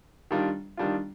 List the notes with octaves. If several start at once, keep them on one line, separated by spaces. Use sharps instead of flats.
D#3 G3 D4 F4
D#3 G3 D4 F4